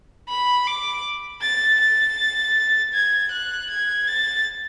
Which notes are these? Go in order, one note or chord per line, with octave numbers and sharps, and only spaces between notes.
B5
D6
A6
A6
G#6
F#6
G#6
A6